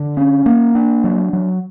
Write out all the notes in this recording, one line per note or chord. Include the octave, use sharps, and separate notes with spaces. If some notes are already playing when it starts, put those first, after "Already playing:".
Already playing: D3
C#4
A#3
D4
F#3
F#3